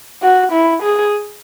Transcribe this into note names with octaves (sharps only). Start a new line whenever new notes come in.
F#4
E4
G#4